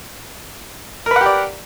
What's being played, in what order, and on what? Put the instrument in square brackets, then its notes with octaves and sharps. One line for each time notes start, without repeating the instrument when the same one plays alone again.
[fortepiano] A#4
B4
F#5
G4
D5